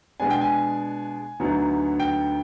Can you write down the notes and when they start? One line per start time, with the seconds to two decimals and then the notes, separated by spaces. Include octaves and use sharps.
0.20 B2 G#3 B3 D4 G#5
0.30 G5
0.41 G#5
1.40 D2 D3 F#3 B3 D#4
2.00 G5